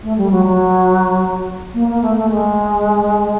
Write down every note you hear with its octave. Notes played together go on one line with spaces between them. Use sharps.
A3
G3
F#3
F#3
A#3
A#3
A3
A3
G#3